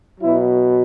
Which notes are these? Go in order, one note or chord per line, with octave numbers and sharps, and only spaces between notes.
B2 F#3 E4